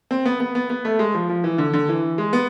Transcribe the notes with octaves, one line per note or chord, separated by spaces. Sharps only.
C4
B3
B3
B3
B3
A3
G#3
F3
F3
E3
D3
D3
E3
G#3
B3